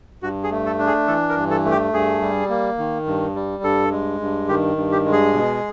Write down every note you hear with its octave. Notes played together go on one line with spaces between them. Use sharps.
G2 F#4
G#4
A3
A4
D4
G#4
E3 A4
A#4
G2
A4
A3
G4
G2 G#4
G3
A#3
D#3
G2
G3
G2 A4
G#3
G2
D#3 G4
G2
G4
G#3
G#4
B2